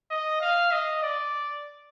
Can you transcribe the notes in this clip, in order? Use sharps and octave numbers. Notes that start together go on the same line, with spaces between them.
D#5
F5
D#5
D5